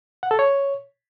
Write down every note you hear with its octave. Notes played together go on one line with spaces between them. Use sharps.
F#5
A4
C#5